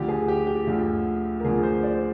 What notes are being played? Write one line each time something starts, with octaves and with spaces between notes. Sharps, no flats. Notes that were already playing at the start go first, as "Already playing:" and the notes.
Already playing: D2 D3 F3 G4
G#4
G4
G4
D2 D3 F3
A#4
D2 D3 F3 G#4
C5
D5
C5